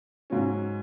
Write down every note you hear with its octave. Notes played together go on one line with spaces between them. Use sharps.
G#2 F#3 C#4